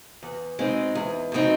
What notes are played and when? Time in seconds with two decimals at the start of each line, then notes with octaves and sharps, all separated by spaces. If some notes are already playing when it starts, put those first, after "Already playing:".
0.23 E2
0.59 B2 G#3 C4 D#4
0.95 E2
1.32 B2 G#3 C4 D#4